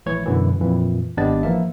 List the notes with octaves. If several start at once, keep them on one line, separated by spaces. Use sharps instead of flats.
A#1 E3 A3 C#5 G#6
F#2 B2 D3 E3
F2 A#2 E3
G#1 B3 D4 G4 D#5 A6
E3 F3 A#3 E5